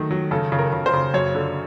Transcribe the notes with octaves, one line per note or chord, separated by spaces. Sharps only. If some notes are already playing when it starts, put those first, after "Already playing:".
Already playing: D#3 F#3 A3
F#3
C#3 A4
C#3
A#4
C#3
C5
C#3
F#2 C#5
D3